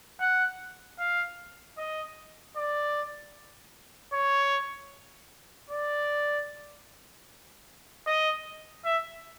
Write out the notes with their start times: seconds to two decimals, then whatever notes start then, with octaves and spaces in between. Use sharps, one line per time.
0.20 F#5
0.99 F5
1.78 D#5
2.56 D5
4.13 C#5
5.70 D5
8.06 D#5
8.85 E5